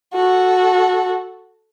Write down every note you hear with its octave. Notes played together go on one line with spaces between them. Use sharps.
F#4 A4